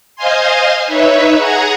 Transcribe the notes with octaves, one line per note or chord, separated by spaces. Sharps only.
C5 D#5 F5 G#5 C6
D#4 B4 C#5 E5
G#4 F#5 A#5 G#6